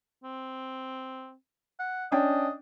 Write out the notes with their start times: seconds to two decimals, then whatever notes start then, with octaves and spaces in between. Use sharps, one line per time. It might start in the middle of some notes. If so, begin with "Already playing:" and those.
0.24 C4
1.80 F#5
2.12 C#4 D4 D#5 G5